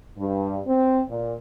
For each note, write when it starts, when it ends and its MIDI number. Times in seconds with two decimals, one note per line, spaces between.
0.18 0.61 43
0.67 1.01 60
1.09 1.33 46